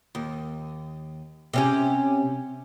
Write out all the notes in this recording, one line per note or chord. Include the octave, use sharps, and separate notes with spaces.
D#2
C3 C#4 G4